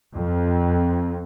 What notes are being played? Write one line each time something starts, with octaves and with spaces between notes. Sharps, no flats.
F2